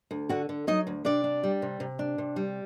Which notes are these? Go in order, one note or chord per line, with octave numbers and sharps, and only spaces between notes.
D2
D3 F#4 F#5
D3
F#3 D#4 D#5
D2
C3 D4 D5
D4
G3
C3
C3
D4
C3
G3